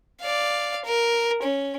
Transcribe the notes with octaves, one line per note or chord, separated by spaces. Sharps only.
D5 F5
A#4
C#4